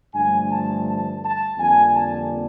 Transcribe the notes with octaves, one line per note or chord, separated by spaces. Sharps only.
G2 D3 F3 A3 G#5
A5
A5
A5
F2 D3 G3 A#3 G#5
A5